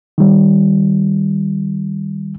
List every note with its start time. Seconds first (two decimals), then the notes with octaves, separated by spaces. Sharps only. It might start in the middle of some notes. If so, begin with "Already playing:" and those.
0.18 D#3 G3